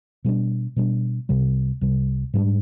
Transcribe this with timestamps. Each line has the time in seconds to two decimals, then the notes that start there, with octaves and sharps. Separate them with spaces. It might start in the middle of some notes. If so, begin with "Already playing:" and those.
0.24 B2 G3 D4
0.76 B2 G3 D4
1.29 C2 C3 G3
1.81 C2 C3 G3
2.34 G#2 G3 B3 D4